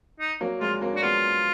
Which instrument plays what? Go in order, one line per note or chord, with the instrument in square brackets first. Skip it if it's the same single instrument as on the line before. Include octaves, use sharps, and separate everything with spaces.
[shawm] D#4
[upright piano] F#3 A#3
[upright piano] G#3 [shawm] F4
[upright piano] F#3 A#3
[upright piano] D4 [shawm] F#4
[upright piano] G#3 B3 [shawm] F4